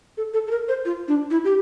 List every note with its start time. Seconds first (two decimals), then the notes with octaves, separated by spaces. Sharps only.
0.17 A4
0.34 A4
0.47 A4
0.51 A#4
0.68 C5
0.85 F4
1.08 D4
1.31 E4
1.44 G4